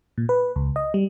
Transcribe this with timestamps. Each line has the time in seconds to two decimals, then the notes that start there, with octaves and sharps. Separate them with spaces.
0.18 A#2
0.29 B4
0.56 C#2
0.76 D#5
0.94 G3